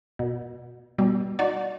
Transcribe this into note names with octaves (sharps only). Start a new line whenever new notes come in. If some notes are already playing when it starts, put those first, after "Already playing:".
B2
B2 G3
D#4 F#4 D5